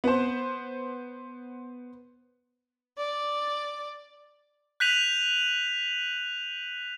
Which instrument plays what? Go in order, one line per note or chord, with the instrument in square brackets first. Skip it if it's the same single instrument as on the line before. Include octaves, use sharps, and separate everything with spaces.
[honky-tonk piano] B3 C5
[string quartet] D5
[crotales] F#6 G6 B6 D#7 F7 F#7